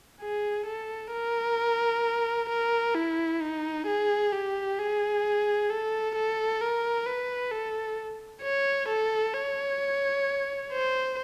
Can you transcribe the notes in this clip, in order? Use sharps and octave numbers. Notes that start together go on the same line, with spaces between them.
G#4
A4
A#4
A#4
E4
D#4
G#4
G4
G#4
A4
A4
A#4
B4
A4
C#5
A4
C#5
C5